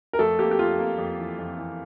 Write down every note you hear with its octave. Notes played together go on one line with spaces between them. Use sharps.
A#4
F2 A3 A4
A#3 G4
G4
F2 F4
A#3
F2
E3
F2
E3